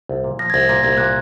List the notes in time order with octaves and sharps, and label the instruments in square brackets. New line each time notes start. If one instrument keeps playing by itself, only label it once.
[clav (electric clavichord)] C2
A#2
[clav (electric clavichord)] F3 [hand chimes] A#6
[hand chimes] G#6
[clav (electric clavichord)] C2 [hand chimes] A#6
[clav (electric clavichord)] A#2 [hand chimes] A#6
[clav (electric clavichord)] C2 [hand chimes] G#6
[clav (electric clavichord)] A#2 [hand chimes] F#6